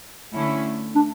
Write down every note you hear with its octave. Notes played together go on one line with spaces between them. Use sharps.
D3 A3 C#4 E4
D4